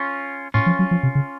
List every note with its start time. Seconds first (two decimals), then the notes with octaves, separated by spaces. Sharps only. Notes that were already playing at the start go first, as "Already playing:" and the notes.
Already playing: C#4 F4
0.54 A2 C#4 F4
0.66 F3
0.79 F#3
0.91 F3
1.03 C3
1.15 C#3